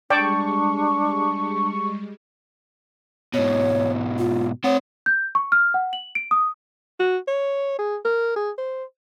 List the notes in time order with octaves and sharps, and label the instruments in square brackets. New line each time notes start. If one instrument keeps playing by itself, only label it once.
[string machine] G3 G#3 [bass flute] D4 [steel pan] D5 G5 A5 [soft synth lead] C#6
[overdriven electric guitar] G#2 B2 [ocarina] C#5
[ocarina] F4
[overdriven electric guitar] C4 F#5 [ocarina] C#5
[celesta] G6
C#6
F6
F#5
F#7
D7
D#6
[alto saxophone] F#4
C#5
G#4
A#4
G#4
C5